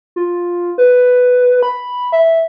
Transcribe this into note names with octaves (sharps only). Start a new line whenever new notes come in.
F4
B4
B5
E5